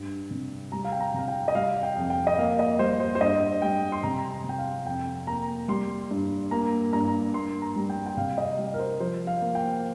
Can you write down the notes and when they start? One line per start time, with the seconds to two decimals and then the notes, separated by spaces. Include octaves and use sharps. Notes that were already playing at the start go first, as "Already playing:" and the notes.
Already playing: G2 G3
0.31 C3
0.72 G3 A#5
0.85 F5
0.92 G5
1.00 A#5
1.14 C3 F5
1.28 G5
1.48 D#5
1.55 G3 F5
1.83 G5
1.97 F2
2.10 G5
2.27 D#5
2.38 A#3 F5
2.59 D#5
2.79 G3 C5
3.00 C5
3.15 C5
3.20 G2 D#5
3.62 G3 G5
3.92 C6
4.03 C3 A#5
4.31 A#5
4.44 C3
4.49 G5
4.58 F5
4.86 F2 G5
5.27 A#3 A#5
5.68 G3 C6
6.11 G2
6.51 A#3 A#5
6.93 G2 A#5
7.34 A#3 C6
7.62 A#5
7.76 G3
7.89 G5
8.06 G5
8.17 C3 F5
8.38 D#5
8.58 G3
8.74 A#4
8.80 C5
9.00 F3 C5
9.27 F5
9.41 A#3
9.55 G5